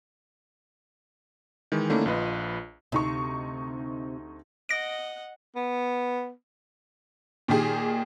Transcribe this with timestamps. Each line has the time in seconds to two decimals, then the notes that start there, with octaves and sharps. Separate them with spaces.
1.72 D#3 E3 G#3
1.90 D3 A3 A#3 C#4 D#4 E4
2.06 A#1 F4 B4 D#5
2.92 D2 C3 D#4 C#6
4.69 D#5 F#5 A#6 D7
5.56 B3
7.48 A#2 D#3 G4 G#4